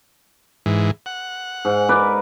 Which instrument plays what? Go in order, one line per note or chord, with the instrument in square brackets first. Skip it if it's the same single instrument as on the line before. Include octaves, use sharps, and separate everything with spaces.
[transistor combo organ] G#2 E3
F#5
[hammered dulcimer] G#2
A#4 B4 D5